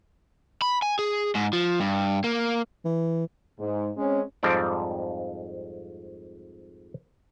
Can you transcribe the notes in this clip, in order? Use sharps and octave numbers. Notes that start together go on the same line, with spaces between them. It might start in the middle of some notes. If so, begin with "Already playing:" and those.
B5
G#5
G#4
G#2
F3
G2
A#3
E3
G#2
G#3 C4 C#4
F2 G#2 F3 G3 C4 D5